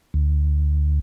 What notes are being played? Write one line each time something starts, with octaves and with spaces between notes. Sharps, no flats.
D2